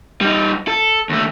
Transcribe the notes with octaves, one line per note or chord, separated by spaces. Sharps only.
G3 D#4
A4
D#2 A3